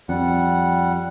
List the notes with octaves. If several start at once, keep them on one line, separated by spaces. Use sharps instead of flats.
F2 G3 F#5